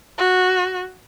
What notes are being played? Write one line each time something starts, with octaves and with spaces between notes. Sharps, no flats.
F#4